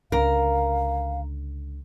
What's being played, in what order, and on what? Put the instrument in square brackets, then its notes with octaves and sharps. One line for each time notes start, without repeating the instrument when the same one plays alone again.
[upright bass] C#2 D3 [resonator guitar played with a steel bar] A#4 [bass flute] F5